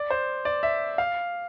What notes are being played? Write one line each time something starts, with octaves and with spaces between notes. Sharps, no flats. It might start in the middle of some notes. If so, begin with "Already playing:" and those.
Already playing: D5
C5
D5
E5
F5